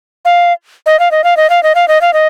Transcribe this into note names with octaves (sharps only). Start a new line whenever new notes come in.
F5
D#5
F5
D#5
F5
D#5
F5
D#5
F5
D#5
F5
D#5